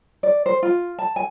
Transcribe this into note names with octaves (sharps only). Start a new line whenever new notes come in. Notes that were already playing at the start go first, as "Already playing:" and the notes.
D5
C5
F4
A5
G#5